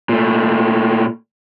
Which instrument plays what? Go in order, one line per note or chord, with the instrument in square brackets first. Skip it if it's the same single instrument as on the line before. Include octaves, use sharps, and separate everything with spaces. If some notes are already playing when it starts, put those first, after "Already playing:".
[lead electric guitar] A#2 A3